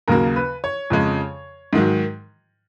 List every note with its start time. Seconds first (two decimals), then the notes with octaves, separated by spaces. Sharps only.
0.08 D#2 C#3 F#3 A#3 A#4
0.36 B4
0.64 C#5
0.90 F2 C#3 G#3
1.73 G#2 D#3 F#3